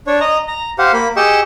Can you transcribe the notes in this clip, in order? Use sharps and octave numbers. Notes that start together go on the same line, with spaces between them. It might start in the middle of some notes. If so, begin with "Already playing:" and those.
D4 C#5
D#5 A#5
A#5
G4 C5 F5 F#5
A#3 B5
G4 G#4 D#5 G5 C#6 E6